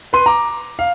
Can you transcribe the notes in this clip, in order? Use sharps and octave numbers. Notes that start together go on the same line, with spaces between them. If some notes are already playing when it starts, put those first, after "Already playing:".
B4 C6 D#7
A#5 D6
F5